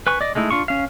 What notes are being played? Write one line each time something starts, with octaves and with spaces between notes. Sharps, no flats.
B4 G#5 C#6
D5 D#5
G#3 A3 D#4 E4
D4 F4 C#6
C#4 F5